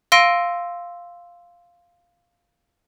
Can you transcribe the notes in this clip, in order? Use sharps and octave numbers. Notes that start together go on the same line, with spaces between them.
F5 C6 E6 A#6 D7 D#7